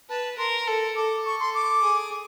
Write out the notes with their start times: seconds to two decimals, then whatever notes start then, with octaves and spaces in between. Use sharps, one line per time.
0.09 B4 A5
0.38 A#4 C6
0.67 A4
0.96 A4 D6
1.26 C#6
1.40 C6
1.55 D6
1.82 G#4